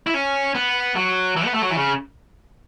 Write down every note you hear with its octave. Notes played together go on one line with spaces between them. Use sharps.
E4
C#4
B3
F#3
E3
B3
A3
F#3
E3
C#3